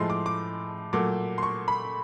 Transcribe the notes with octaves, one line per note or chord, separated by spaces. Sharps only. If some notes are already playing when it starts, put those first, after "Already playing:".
Already playing: A2 F3 G#3 C6
D6
D6
A#2 F#3 A3 D6
C6
C#6
B5